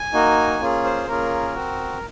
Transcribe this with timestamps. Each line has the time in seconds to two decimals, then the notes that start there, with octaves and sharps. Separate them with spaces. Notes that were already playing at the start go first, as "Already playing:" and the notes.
Already playing: G#5
0.13 A#3 D#4 F#4
0.61 A#3 C#4 F4 G#4
0.84 C5
1.07 A#3 C#4 F4 G#4 A#4
1.55 C4 F#4